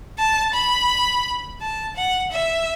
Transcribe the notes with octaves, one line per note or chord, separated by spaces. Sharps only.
A5
B5
A5
F#5
E5